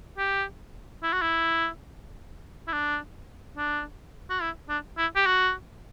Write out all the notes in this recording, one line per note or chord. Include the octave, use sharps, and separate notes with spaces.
G4
E4
F#4
E4
E4
D4
D4
F#4
E4
D4
E4
G4
F#4